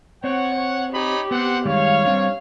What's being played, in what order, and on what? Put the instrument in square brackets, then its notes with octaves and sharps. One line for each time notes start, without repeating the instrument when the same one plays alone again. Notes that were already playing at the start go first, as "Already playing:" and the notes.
[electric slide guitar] C4 [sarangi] C#5 [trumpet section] F#5
[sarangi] C#5
[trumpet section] D#4 C#5 B5 [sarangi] G4
[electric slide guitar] B3 [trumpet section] C4 F#5
[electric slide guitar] D#3 G3 G#3 [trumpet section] C#5 [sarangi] F5
[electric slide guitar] G3 C4 D4